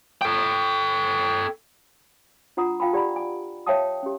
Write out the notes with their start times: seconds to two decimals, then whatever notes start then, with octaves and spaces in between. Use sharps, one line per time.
0.22 A4 G5
2.57 D4 F4 F#5 A#5 D#6
2.80 F4 F5 G5 A5 B5
2.93 G4 D5 F#5 A#5 B5
3.16 G#5
3.66 C#5 E5 F5 G5 A5 D#6
4.03 C#4 G4